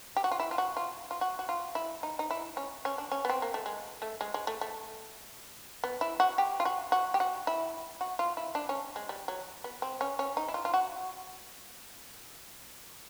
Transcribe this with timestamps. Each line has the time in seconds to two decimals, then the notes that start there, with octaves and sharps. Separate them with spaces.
0.17 G4
0.24 F#4
0.31 F4
0.40 E4
0.51 F4
0.58 F#4
0.77 F4
1.11 F4
1.21 F#4
1.39 F#4
1.49 F4
1.75 E4
2.03 D#4
2.19 D#4
2.31 E4
2.57 C#4
2.85 C#4
2.98 D4
3.12 C#4
3.25 B3
3.30 C4
3.42 A#3
3.54 A3
3.66 G#3
4.02 A3
4.21 G#3
4.34 G#3
4.47 A3
4.61 A3
5.84 B3
6.01 E4
6.20 F#4
6.38 G4
6.60 F4
6.65 F#4
6.92 F#4
7.14 G4
7.20 F#4
7.47 E4
8.01 F#4
8.19 F4
8.37 E4
8.55 D4
8.69 C#4
8.96 G#3
9.09 G3
9.28 F#3
9.64 B3
9.82 C4
10.01 C#4
10.19 C#4
10.37 D#4
10.49 E4
10.54 F4
10.65 F4
10.74 F#4